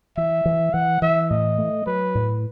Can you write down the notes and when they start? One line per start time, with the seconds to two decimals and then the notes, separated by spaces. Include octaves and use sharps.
0.17 E3 E5
0.45 E3
0.73 E3 F#5
1.02 E3 E5
1.30 A2 D#5
1.58 A3
1.86 F#3 B4
2.15 A2